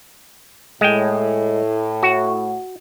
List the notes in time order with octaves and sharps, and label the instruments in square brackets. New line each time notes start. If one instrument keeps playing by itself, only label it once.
[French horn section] A2 [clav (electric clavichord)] G#3 G5
[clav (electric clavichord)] F#4